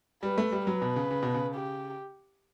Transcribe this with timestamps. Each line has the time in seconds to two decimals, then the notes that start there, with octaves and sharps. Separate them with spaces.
0.23 G3 B4
0.38 A3
0.52 G3
0.67 F#3 B4
0.82 B2
0.96 C#3
1.11 C#3
1.23 B2
1.35 C#3
1.55 G4